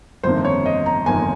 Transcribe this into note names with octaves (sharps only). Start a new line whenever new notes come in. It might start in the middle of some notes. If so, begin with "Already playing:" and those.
G1 F2 C3 D#3 A#3 C5
C#5
D#5
A#5
G1 F2 C3 D#3 A#3 G#5